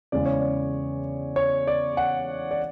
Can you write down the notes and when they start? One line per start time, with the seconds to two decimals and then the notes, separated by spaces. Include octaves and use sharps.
0.12 E2 C#3 E3 G#3 D5
0.26 C#5
0.40 D5
1.36 C#5
1.67 D5
1.97 F#5
2.51 D5